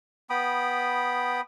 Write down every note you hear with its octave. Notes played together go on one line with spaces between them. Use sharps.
B3 G5 B5 D#6